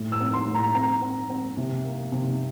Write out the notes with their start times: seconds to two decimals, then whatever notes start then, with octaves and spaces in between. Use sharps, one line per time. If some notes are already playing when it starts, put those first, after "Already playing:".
Already playing: A2
0.12 E6
0.20 C4
0.33 C6
0.47 A2
0.54 A#5
0.75 C4 A#5
1.02 C4
1.30 C4
1.57 C3
1.85 A#3
2.12 C3